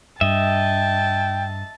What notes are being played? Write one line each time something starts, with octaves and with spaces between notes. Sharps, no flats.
G2 D#5 E5 G5 A5